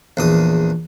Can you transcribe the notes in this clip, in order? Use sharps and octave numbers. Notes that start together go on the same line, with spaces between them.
A#1 E2 D#6